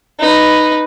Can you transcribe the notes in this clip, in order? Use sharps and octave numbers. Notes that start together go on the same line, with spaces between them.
D#4 B4